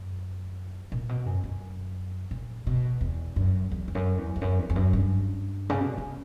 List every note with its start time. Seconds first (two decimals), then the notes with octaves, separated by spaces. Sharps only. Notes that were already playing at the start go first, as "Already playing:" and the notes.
Already playing: F#2
0.92 A#2
1.09 B2
1.26 F#2
1.44 F#2
2.31 A#2
2.67 B2
3.01 E2
3.36 F#2
3.71 E2
3.88 E2
3.95 F#2
4.18 E2
4.36 E2
4.41 F#2
4.59 E2
4.70 E2
4.76 F#2
4.93 G2
5.69 C#3
5.80 B2
5.98 C#3